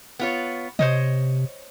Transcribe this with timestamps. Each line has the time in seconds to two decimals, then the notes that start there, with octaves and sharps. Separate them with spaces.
0.19 B3 F4 C#5
0.79 C3 C5 C#5 D#5